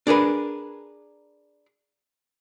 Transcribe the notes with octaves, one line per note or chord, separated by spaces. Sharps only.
D4 G#4 A#4 B4